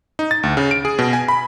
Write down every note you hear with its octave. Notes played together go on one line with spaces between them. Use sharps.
D#4
A6
D2
C#3
D7
G#4
B2
G#5
B5